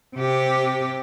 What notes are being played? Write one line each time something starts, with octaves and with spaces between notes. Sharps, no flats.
C3 G4